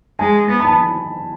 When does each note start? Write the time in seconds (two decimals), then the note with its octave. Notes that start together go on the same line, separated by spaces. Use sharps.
0.19 G#3 G#5
0.50 B3
0.60 B5
0.65 A5